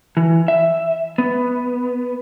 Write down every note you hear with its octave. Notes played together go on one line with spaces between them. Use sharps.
E3
E5
B3